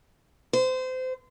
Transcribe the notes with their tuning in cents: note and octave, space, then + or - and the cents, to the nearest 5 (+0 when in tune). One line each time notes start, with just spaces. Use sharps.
C5 -25